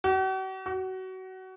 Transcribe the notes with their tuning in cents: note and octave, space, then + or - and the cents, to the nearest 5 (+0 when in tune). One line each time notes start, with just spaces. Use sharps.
F#4 +45
F#4 +25